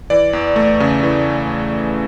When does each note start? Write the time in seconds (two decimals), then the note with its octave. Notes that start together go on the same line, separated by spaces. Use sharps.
0.10 E3 D5
0.33 E2
0.56 A3
0.80 C#3
1.03 E3